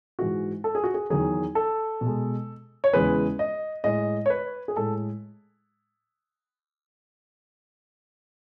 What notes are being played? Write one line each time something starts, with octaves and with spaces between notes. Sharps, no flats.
G#2 E3 G#3 F#4
A4
G#4
F#4
G#4
E2 D#3 F#3 G#4
A4
B2
G#3
C#5
E2 C#3 E3 G#3 B4
D#5
A2 G#3 D#5
C#5
B4
G#4
A2 G#3 A4